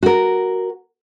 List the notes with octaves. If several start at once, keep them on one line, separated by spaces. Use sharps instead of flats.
F#4 A#4